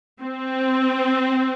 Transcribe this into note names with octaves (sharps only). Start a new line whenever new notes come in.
C4